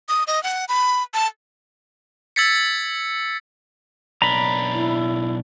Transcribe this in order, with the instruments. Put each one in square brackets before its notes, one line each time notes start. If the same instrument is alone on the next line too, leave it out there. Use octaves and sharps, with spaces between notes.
[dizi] D#6
D#5
F#5
B5
A5
[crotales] E6 G#6 A6 B6 C#7
[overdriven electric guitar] B1 D4 [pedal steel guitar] A#5 B5
[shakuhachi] E4